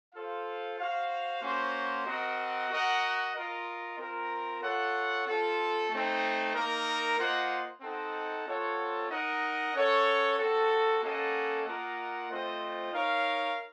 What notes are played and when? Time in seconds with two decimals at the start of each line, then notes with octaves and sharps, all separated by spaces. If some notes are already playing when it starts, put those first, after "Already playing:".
0.14 F4 A4 C5 F5
0.79 F#4 C5 F5
1.42 A#3 C#4 F#4 C5
2.06 C4 F#4 A#4 D#5 F#5
2.70 F#4 A#4 D#5 F#5
3.34 F4 A#4 D#5
3.98 C4 F4 A#4
4.62 F4 A4 C#5 F#5
5.26 C4 F4 A4
5.90 A3 C4 D#4
6.54 A#3 D#4 A#4
7.18 A#3 F4 C5 D#5 F#5
7.81 C4 D#4 A4 D#5 F#5
8.45 C4 F4 A4 C#5 F#5
9.09 D#4 A#4 D#5 F#5
9.73 C#4 A4 C#5 F#5
10.37 C4 F#4 A4
11.01 A#3 C#4 A4 D#5 F#5
11.65 A#3 F4 A#4 D#5 F#5
12.30 A3 C4 F4 C5 D#5
12.93 D#4 A#4 C#5 F5